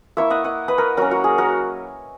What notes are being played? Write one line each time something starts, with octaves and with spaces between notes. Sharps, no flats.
A#3 E4 C#5 E5
D#5 F#5
D#5 F#5
B4 D#5
A#4 C#5
F#3 A#3 C#4 F#4 A#4
F#4
G#4
F#4 A#4